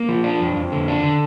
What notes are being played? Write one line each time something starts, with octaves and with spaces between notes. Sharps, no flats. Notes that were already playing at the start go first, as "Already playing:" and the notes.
Already playing: A#3
F3
D4
F2
F2
D3
D4
D3